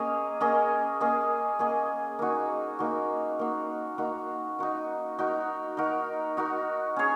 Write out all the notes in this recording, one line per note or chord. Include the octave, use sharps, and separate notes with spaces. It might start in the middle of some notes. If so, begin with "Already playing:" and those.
Already playing: A#3 C#4 G#4 D#5
A#3 C#4 G#4 D#5
A#3 C#4 G#4 D#5
A#3 C#4 G#4 D#5
A#3 D#4 F#4
A#3 D#4 F#4
A#3 D#4 F#4
A#3 D#4 F#4
D#4 F#4 A#4
D#4 F#4 A#4
D#4 F#4 A#4
D#4 F#4 A#4
C#4 G#4 C#5